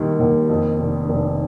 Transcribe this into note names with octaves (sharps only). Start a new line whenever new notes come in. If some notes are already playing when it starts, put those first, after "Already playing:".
Already playing: D#2 D#3 G3
D#2
F2
F1
F1